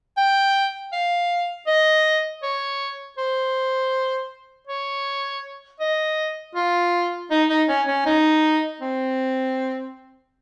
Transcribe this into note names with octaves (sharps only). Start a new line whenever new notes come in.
G5
F5
D#5
C#5
C5
C#5
D#5
F4
D#4
D#4
C#4
C#4
D#4
C4